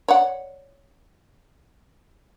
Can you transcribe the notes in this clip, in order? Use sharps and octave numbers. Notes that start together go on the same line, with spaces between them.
C#5 D5 F#5